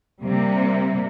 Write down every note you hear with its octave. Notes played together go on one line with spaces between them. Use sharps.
C3 G3 A#3